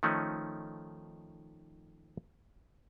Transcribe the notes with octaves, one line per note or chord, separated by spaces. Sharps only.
D#3 F3 A3 C#4 D#4